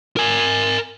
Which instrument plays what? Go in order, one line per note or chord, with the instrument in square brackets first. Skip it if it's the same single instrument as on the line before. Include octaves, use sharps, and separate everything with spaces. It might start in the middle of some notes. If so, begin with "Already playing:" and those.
[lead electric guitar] A#4 G#5